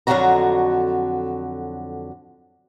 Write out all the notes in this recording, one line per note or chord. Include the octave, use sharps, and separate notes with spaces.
F2 D3 F3 F#3 F#4 A#5